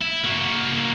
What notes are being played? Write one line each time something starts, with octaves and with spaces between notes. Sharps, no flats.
E4
A#3 F#4